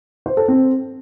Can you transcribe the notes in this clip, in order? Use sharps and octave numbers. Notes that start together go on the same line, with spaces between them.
C5
A4
C4